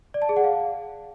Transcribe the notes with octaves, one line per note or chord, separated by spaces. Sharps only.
D5
A5
G#4
F#5
F5